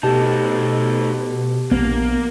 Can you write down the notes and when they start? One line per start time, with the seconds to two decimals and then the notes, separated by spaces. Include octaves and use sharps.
0.03 B2 A3 D#4 G4 A5
1.71 A#1 A#3 B3